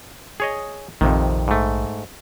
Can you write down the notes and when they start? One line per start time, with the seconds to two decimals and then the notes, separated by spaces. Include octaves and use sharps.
0.40 G#4 C#5 D#5
1.01 A#1 F2 C3 D#3
1.48 G#2 A3